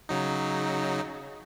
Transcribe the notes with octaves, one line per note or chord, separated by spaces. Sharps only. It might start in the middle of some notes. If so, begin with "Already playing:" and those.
C#3 F#3 D#4